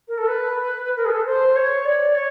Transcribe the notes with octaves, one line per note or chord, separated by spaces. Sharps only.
A#4
A4
B4
A#4
G#4
A4
C5
C#5
D5
C#5